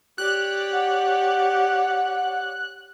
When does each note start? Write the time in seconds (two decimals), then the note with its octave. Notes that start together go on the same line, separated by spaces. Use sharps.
0.18 G4 C#5 D5 F#6
0.73 F#5